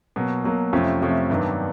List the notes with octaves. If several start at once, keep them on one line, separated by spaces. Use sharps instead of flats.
B2 F#3 A#3
B2 F#3 A#3
F2 C3 F3 A3 C#4
F2 C3 F3 A3 C#4
G2 D#3 F#3 B3 D4